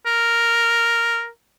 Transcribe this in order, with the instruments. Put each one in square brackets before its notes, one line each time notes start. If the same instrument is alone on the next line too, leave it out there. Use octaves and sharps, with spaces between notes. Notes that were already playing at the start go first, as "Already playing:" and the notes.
[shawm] A#4